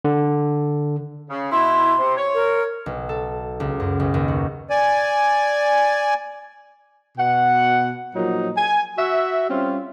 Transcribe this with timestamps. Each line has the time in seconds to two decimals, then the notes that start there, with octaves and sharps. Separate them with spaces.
0.05 D3
1.30 C#3
1.52 B2 E4 C6
1.99 C3
2.17 C#5
2.34 A#4
2.86 B1
3.09 A4
3.60 C#2
3.80 F#2
4.00 B1
4.14 D#2
4.28 F#4
4.70 D5 G#5
7.18 B2 F#5
8.15 A#2 F3 F#3 D#4
8.57 G#5
8.98 F#4 E5
9.50 G3 C4 C#4 F4